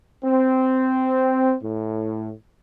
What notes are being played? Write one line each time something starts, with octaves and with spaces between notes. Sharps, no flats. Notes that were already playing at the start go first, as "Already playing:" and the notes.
C4
A2